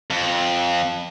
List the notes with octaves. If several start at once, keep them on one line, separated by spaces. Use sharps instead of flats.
F2